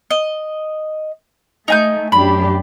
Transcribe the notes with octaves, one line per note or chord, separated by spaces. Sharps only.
D#5
A3 D#4 G#5 G6
F#2 D4 G4 B5